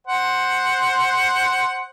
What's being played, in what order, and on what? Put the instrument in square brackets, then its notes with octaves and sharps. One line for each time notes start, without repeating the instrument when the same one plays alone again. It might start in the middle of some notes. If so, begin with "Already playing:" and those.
[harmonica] C5 F#5